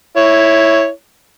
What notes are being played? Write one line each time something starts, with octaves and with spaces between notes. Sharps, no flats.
E4 C#5